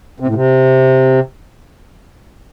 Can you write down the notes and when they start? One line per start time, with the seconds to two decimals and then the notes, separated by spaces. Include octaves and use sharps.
0.20 C3
0.27 A2
0.35 C3